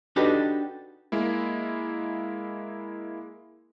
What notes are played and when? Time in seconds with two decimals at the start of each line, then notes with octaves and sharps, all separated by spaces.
0.16 D4 D#4 F#4 G4 A4 B4
1.12 G#3 A#3 E4